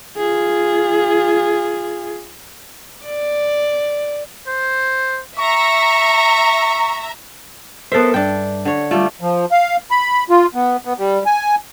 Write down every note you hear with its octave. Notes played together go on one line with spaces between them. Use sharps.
F4 G#4
D5
C5
E5 A#5 C#6
B3 A4 A#4 C5 E5
G2 D4 G5
D3 C#5
G3 A3 F4
F3
F5
B5
F4
B3
B3
G3
G#5